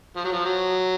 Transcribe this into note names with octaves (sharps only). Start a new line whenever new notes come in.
F3
F#3
F3
F#3